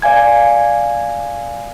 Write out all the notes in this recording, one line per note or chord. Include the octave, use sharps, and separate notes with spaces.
D5 F5 G#5 G#6